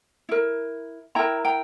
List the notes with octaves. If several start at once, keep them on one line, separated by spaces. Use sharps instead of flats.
E4 A#4
E4 A#4 G5 A#5
G5 A#5